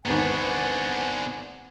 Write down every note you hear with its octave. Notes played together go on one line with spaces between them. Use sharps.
G#1 E2 B3 D4 C5 F#5 G#5